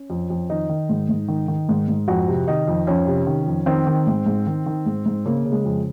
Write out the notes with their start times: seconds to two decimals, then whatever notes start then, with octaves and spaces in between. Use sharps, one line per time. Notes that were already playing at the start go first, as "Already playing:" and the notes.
Already playing: C#4
0.10 F2
0.30 F2
0.50 D#3 D#4
0.69 D#3
0.89 G#2
1.09 G#2
1.28 D#3
1.48 D#3
1.69 G#2
1.88 G#2
2.08 F2 F#4
2.28 C3
2.48 D#3 D#4
2.67 F2
2.87 F2 C#4
3.07 C3
3.27 D#3
3.46 F2
3.66 D#3 C4
3.87 D#3
4.07 G#2
4.26 G#2
4.47 D#3
4.66 D#3
4.86 G#2
5.06 G#2
5.25 C#3 A#3
5.45 C#3
5.52 G#3
5.65 F2